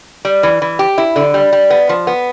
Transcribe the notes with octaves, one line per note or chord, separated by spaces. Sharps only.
G3
E3
E3
G4
E4
D3
G3
G3
B3
F3
B3